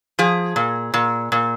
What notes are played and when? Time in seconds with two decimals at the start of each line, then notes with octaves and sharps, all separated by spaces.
0.19 F3 G#4
0.56 A#2
0.94 A#2
1.32 A#2